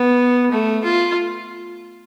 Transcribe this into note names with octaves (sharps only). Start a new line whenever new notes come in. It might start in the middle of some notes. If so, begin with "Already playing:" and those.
Already playing: B3
A3
F4